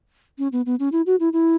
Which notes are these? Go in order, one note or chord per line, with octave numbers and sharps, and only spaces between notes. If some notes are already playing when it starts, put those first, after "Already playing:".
C#4
B3
B3
C#4
E4
F#4
E4
E4